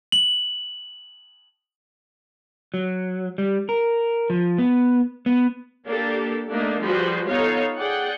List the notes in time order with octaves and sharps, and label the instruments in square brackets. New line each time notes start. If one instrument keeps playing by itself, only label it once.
[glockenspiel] F#7
[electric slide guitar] F#3
G3
A#4
F3
B3
B3
[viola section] A#3 D4 G4 A4
A3 A#3 D4 D#4
F3 G3 F#4 G#4 B4 C5
B3 D#4 F4 A4 C#5 F5
G#4 D5 F#5 G5